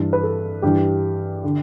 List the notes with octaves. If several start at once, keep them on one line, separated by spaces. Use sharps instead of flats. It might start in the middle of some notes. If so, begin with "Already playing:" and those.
Already playing: G2 E3
B4
A4
G2 E3 G4
D3